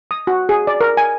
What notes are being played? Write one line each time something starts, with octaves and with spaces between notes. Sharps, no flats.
D#6
F#4
G#4
D5
A#4
G#5